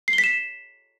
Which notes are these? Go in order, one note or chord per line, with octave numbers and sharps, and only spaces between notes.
C7
G7
B6
E7